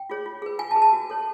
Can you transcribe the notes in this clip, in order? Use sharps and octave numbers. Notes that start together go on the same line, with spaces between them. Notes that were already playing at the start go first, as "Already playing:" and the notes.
Already playing: G5
F4 G#4 C#5
F4
G#4 B4
F4 G#5
A5
G#4 B4
A5
F#4
A4 C#5